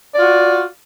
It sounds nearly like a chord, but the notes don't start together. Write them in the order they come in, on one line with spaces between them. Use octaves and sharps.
D5 F4 F#4